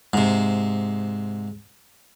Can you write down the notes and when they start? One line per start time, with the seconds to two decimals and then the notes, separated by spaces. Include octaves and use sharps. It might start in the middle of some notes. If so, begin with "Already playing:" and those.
0.13 G#2 C3